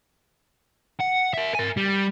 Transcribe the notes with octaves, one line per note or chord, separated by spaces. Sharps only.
F#5
A#4 E5
A#4 G#5
G3